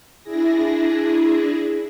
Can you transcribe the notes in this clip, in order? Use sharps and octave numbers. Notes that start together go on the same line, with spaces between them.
D4 E4 G#4 A#6